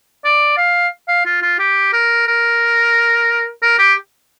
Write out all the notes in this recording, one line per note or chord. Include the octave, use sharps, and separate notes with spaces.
D5
F5
F5
F4
F4
G4
A#4
A#4
A#4
G4